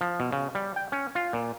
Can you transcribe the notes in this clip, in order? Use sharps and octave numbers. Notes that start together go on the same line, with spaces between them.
F3
B2
C#3
G3
G5
C#4
F4
A#2